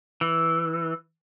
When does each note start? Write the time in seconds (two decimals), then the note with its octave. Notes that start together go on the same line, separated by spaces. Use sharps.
0.21 E3